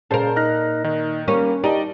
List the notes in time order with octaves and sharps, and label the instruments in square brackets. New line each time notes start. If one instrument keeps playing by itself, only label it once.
[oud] A#2 A#4 [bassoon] C#3 [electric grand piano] C5 A5
[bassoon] D#4 [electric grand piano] F6 F#6 A#6
[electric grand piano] D#3 [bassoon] D#4
[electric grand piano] G3 [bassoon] A#3 [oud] C#4
[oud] D#4 [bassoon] G4 [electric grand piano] D5 D#5 A5